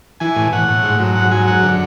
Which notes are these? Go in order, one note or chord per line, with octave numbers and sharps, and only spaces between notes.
E3 G#5
A2
A2 F#5
A2
G#2
F#3
G#2 F#5
F#3 G#5
F#2 F#5
D3